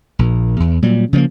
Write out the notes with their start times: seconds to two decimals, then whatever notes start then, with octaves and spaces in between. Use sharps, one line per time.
0.19 A#1 A#2
0.60 E2
0.82 A#2 F#3 G3
1.13 C#3 F3 F#3 A#3